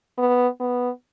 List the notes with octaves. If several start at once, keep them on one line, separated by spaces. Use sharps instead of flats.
B3
B3